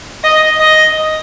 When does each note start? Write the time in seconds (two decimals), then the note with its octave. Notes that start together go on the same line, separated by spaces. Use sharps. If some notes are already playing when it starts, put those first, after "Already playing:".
0.24 D#5
0.60 D#5